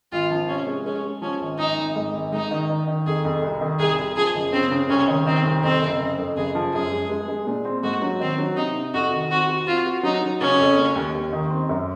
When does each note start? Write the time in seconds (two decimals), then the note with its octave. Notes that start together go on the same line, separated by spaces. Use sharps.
0.12 G#1 F4
0.31 F3
0.48 C3 C#4
0.67 G#3
0.86 G#3 C#4
1.04 G#3
1.22 F3 C#4
1.41 G#1
1.58 G#1 D#4
1.78 G#1
1.96 G#2
2.14 G#1
2.32 G#2 D#4
2.51 D#3
2.70 D#3
2.88 D#3
3.06 F2 G#4
3.25 F2
3.42 C2
3.61 D#3
3.79 C2 G#4
3.98 C2
4.16 F3 G#4
4.34 F#1
4.52 C#3 C4
4.71 C#3
4.89 C2 C#4
5.08 D#3
5.26 D#3 C4
5.45 C2
5.63 F2 C4
5.81 F#1
6.00 F#1
6.18 F2
6.37 F#1 G#4
6.55 F3
6.73 F#2 G#4
6.92 G#3
7.10 G#3
7.29 G#3
7.47 A#2
7.65 C4
7.83 G#2 F#4
8.02 F#3
8.20 D#3 C4
8.38 F#3
8.56 C3 D#4
8.75 C3
8.94 F2 F#4
9.12 D#3
9.31 C4 F#4
9.49 F#4
9.67 C4 F4
9.85 F#4
10.03 F#3 D#4
10.22 F#3
10.41 C#3 C#4
10.59 F2
10.78 A#3
10.95 D#2
11.14 D#2
11.33 D#3
11.51 C4
11.69 F#2